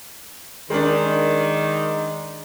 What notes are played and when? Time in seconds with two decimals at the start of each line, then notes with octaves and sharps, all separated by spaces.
0.70 D#3 G#3 D4